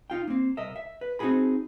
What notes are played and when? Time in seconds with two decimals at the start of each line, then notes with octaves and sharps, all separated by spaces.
0.10 D#4 F4 G5
0.28 A#3 C4
0.57 C2 A#4 D#5 E5
0.76 E5
1.01 B4
1.19 C4 D#4 E4 F#4 G#4 B5